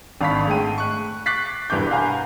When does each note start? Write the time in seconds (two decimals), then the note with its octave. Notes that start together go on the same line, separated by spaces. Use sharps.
0.21 G#1 D4 F5 B5 C#6 B6
0.47 G#2 G#3 A3 G5 D#7
0.78 C#6 F#6
1.26 C#6 D6 F#6 A6 B6 C7
1.70 E1 G2 E3 B4 D6 G6
1.91 F5 F#5 G#5 A#5 B5